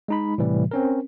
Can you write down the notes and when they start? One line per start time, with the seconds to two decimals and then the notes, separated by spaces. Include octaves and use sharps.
0.08 G#3 D#4 B5
0.38 A2 C3 E3 G3
0.71 C4 C#4 A#4